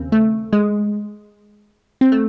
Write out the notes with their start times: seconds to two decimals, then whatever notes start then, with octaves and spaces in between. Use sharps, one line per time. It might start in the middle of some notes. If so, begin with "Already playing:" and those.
Already playing: D#2 C#3 C4
0.12 A3
0.53 G#3
2.01 C4
2.12 A3